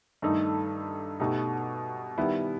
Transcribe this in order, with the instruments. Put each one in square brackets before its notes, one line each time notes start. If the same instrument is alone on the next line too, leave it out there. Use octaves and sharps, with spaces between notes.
[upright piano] G2 D#3 A3 D#4 A4
B2 A3 D#4 G4
D#3 G3 B3 E4